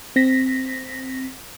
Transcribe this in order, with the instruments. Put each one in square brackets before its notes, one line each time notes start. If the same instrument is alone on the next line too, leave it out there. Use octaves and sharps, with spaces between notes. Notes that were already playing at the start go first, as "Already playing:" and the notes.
[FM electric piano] C4 A#6 B6